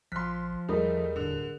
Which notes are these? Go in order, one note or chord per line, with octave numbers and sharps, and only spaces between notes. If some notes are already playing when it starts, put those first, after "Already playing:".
A#1 F3 C6 F6 F#6 B6
E2 G3 A3 D#4 G#4 A#4 D#6
D1 D3